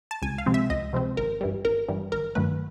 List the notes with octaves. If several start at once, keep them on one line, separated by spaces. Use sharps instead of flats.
A5
C#2 G#5
F5
C3 F3 G#3 C4
E5
C#2 D#5
C3 F3 G#3 C4
G#1 A#4
G2 E3 G3
G#1 A#4
G2 E3 G3
G#1 A#4
G2 D#3 F#3 A3 B4